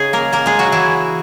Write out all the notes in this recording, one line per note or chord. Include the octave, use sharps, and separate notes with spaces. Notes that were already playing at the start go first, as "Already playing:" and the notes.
Already playing: C#3 C#4 D#4 G#4
A#3 A#4
A#3 A#4
G#3 G#4
F#3 F#4
E3 E4